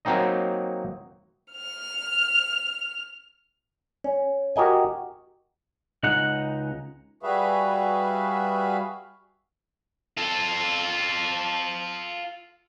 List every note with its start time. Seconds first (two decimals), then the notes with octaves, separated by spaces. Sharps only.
0.05 F#3 A#3 C4 D#4 D#5
1.53 F6 F7
4.04 C#4
4.56 F#4 G4 A#4 D#5 G#5
6.03 C#2 G#3 D#4 F#5
7.23 G3 F#4 G#4 B4 E5 F5
10.17 F4 A4